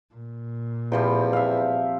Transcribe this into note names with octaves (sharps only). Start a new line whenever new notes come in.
A#2
E2 C3 F3 G3
E5 F5